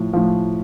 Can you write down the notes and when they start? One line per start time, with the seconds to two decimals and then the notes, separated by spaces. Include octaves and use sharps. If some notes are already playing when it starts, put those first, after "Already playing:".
Already playing: A2 F3
0.13 A2 F3